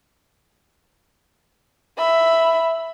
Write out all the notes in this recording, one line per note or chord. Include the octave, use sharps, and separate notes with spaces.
E5 B5